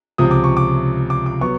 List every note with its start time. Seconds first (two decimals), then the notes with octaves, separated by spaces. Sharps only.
0.18 C#2 C3 F3 D#6
0.31 D6
0.44 C#6
0.57 D6
1.10 D6
1.26 D6
1.41 F#3 B3 C#6